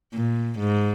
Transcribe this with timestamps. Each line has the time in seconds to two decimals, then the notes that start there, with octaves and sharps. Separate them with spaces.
0.13 A#2
0.59 G#2